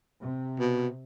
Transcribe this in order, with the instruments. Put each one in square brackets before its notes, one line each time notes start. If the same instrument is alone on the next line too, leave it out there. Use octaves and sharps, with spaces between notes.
[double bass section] C3
[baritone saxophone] B2